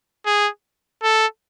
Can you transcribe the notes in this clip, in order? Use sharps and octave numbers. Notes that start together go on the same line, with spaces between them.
G#4
A4